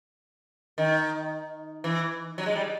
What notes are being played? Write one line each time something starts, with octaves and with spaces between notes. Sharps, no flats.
D#3
E3
F#3
G#3
G3